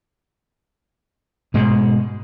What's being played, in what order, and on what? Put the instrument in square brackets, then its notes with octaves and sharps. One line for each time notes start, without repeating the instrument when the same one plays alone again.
[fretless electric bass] G#2 B2 G#3